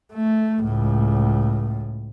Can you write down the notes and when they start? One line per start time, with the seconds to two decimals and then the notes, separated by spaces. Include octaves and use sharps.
0.14 A3
0.61 C#2 A2